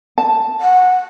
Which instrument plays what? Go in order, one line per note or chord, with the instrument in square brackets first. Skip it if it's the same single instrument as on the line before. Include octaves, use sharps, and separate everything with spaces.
[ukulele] A5
[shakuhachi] F#5